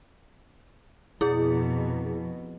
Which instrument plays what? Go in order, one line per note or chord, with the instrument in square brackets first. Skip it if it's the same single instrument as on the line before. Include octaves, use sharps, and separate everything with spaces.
[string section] F2 B2 [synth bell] E4 G#4